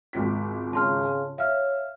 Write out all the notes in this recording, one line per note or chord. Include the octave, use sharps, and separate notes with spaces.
G#1 C#2 B6
C#3 A5 C6 F6
C#5 E5 F5 F6